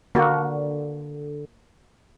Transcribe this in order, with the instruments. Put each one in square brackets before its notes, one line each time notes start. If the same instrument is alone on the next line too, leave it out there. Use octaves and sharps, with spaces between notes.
[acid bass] D3 [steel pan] A#3 F#4